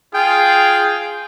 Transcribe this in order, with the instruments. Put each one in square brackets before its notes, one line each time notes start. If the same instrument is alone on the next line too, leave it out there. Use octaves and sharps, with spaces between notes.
[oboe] F4 [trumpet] G#4 [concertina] G5